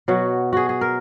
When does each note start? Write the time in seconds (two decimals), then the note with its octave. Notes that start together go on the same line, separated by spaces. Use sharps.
0.08 B2 F#3 F#4
0.53 F#4 G#4
0.69 G#4
0.81 A#4